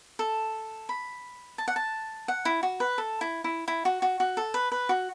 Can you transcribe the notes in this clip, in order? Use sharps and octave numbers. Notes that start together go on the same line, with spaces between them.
A4
B5
A5
F#5
A5
F#5
E4
F#4
B4
A4
E4
E4
E4
F#4
F#4
F#4
A4
B4
B4
F#4